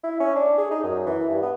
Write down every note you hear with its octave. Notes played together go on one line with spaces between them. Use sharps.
E4
C#4
D4
G#4
D#4
F#2
E3
G2
B3